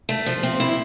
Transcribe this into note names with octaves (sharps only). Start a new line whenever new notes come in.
A3
F3
C4
E4